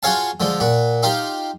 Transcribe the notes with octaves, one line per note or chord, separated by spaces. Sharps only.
F4 F#4 G#4 C#5 F5 A5
D3 F3 G#3
A#2 F#4
D#4 F4 G4 F5